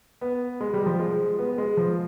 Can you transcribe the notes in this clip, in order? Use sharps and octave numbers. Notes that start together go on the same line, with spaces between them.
B3
G#3
G3
F3
G#3
B3
G#3
F3